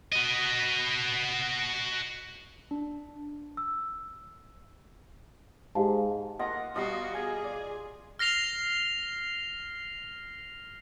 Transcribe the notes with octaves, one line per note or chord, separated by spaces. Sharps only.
F#4 D#5
D4
E6
G#2 G4 F5 A5
A#3 F4 D#5 F#5 A#5
B2 G3 F#4 D#5 F5 A#5 C6 D#6
G#4 G#5
D5
F6 A#6 C7 F7 G7